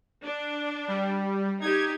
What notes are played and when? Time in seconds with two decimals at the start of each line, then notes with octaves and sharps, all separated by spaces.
0.23 D4
0.88 G3
1.61 D#4 G4 G#6